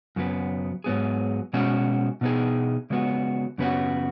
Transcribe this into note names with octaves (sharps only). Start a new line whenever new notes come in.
F#2 C#3 F#3 B3
G#2 F#3 B3 G#4
B2 G#3 C#4 F#4
B2 B3 D#4 G#4
C#3 G#3 B3 F#4
F#2 C#3 B3 F#4